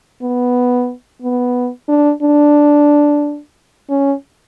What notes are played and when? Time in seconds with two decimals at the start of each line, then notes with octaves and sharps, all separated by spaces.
0.22 B3
1.22 B3
1.89 D4
2.23 D4
3.90 C#4